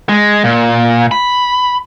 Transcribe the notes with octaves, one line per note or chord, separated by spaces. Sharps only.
G#3
A#2
B5